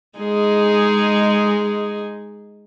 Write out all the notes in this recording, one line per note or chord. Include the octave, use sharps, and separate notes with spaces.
G#3 D#4 G#4